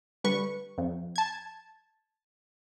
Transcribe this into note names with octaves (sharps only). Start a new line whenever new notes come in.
D3 G3 B4 C#6
F2
A5 G#6